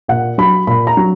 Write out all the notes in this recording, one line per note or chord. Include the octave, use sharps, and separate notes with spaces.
A#2 F#5
F#3 B5
A#2 B5
A#5
F#3